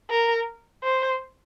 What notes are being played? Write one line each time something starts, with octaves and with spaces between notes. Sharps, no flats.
A#4
C5